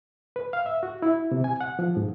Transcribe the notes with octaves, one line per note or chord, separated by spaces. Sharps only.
B4
F5
E5
F#4
E4
C3
G#5
F#5
F3
G#2